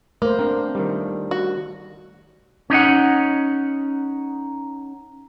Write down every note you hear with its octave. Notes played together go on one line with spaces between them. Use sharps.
A3 A#3 C5
C4 D4 A#4
D#3 G3
F#4
C#4 D#4 D#5 F#5